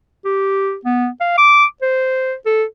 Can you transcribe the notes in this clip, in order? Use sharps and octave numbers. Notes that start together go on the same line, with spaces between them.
G4
B3
F5
D6
C5
A4